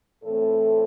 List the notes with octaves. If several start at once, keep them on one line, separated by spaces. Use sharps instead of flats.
A2 E3 A3 C4 A4